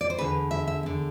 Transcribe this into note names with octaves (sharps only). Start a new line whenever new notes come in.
D5
C5
E2 D3 B4
E5
E5
E2 D3